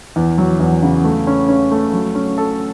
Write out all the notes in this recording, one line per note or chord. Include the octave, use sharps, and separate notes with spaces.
E2
F#3
E2
C#3
A3
C#4
C#4
A3
F#3
C#4
A4